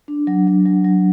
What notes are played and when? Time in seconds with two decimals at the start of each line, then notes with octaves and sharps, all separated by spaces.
0.08 D4
0.27 F#3
0.47 F#3
0.66 F#3
0.84 F#3